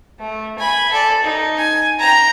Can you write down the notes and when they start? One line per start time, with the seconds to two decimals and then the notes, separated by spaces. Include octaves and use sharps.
0.19 A3
0.58 G#5 B5
0.92 A4 D5
1.24 D#4
1.58 G#5
1.99 G5 A#5